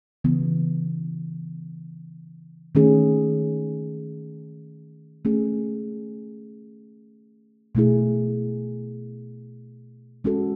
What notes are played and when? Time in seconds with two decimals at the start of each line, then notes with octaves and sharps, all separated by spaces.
0.24 C#3 E3 B3
2.75 D#3 A3 C#4 G#4
5.25 A3 C#4 G#4
7.75 B2 A3 E4 G#4
10.24 G#3 C#4 F#4 A4